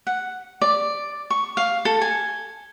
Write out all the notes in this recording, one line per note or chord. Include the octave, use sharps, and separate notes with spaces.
F#5
D5
C#6
F5
A4
G#5